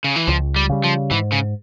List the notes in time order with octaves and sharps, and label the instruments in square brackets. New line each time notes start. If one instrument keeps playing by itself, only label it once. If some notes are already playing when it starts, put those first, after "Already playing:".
[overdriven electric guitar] C#3
E3
[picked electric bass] C#2 [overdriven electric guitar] F3
[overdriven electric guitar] G3
[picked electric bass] C#3 G3
[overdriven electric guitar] F3
[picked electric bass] G#2 [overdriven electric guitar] E3
[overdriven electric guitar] C#3